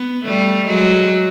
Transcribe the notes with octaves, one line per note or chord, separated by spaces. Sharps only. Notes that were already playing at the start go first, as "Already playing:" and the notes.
Already playing: B3
G3 A3
F#3 G#3